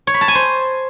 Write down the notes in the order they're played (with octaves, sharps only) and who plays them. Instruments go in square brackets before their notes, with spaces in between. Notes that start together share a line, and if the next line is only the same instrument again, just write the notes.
[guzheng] C#5
B5
A5
G#5
C5